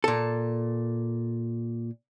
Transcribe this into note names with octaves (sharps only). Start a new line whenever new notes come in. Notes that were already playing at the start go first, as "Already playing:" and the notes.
A#2 A4